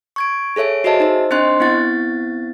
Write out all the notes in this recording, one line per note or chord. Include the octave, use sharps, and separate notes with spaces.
C#6 G#6 D7
G#4 A4 C#5 E5 D7
F#4 G#4 C5 D#5 E5 A5
D#4 C5
C4 D4 C5 D#5 C6 F#6
B3 C4 E4 F#5 A6